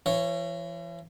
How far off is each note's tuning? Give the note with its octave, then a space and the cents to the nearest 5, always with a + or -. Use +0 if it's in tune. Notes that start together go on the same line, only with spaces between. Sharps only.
E3 +45 C#5 +0